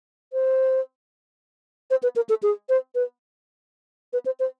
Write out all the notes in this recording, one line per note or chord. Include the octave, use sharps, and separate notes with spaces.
C5
C5
B4
A#4
A4
G#4
C5
B4
B4
C5
C5